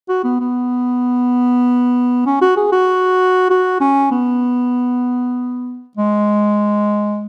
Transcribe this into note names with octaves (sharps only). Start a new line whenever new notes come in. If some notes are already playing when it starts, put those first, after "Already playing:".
F#4
B3
B3
C#4
F#4
G#4
F#4
F#4
C#4
B3
G#3